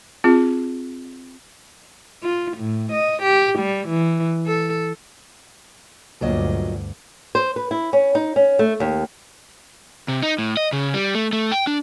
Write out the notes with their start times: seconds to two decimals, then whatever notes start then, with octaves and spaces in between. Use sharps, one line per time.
0.24 C4 F4 G#4
2.23 F4
2.58 A2
2.93 D#5
3.23 G4
3.59 G3
3.89 E3
4.47 A4
6.21 D2 G2 A#2 F#3 D#5
7.35 C5
7.56 B4
7.71 E4
7.93 C#4
8.15 D#4
8.36 C#4
8.59 A3
8.80 D#2
10.08 C3
10.23 D#4
10.38 A2
10.57 D#5
10.73 C#3
10.94 G3
11.15 A3
11.33 A3
11.52 G5
11.67 D4